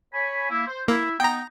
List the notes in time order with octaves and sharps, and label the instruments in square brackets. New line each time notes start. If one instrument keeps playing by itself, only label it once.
[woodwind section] C#5 G#5 B5
A#3 E4
C5
[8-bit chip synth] A#3 [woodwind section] E4
[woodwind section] B3 D#4 [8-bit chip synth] G5 A#5